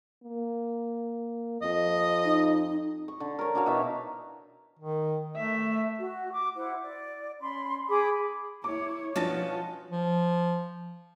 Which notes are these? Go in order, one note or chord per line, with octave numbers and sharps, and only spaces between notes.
A#3
F2 D#5
D#4
C#6
D3
A#4 C#5
D4 F#4 C#5 F5
B2 E3 D#4 E5
D#3
A3 E5
F#4
D6
E4 C5 F#5
D5
C#4 B5 C6
G#4 B5 D6 D#6
E4 C#5 D6
B2 F3 C#4 D4 F4 F#4 A5 A#6
F3